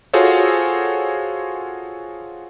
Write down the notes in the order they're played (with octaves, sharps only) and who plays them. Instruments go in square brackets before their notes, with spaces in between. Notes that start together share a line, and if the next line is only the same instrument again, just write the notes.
[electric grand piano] F4 F#4 G#4 A4 C5 C#5